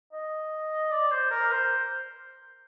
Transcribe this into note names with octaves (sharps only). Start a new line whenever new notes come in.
D#5
D5
C5
A#4
C5